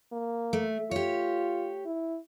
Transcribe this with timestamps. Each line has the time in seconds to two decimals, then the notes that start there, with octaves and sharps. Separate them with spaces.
0.12 A#3
0.53 A3
0.91 F4 G4 C#5
1.86 E4